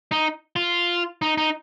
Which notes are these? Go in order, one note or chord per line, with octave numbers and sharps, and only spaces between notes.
D#4
F4
D#4
D#4